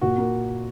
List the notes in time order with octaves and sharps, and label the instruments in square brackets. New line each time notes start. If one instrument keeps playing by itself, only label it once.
[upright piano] A#2 F#4
A#3